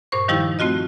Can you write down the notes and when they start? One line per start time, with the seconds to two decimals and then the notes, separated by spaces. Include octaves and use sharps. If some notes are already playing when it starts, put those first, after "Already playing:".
0.12 G2 A#2 C5 C#6
0.28 D#3 F3 G3 D#4 E4 G4
0.59 A3 C4 F4 F#4 D#5